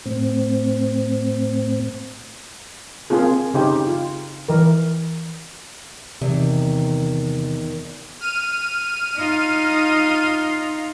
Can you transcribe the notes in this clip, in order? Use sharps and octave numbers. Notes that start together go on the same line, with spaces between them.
A2 C4
A#3 C4 F4 G#4
C#3 D#4 G4 C5
F4
E3 A#4
E2 C3 D#3
F6 D#7
D#4 F4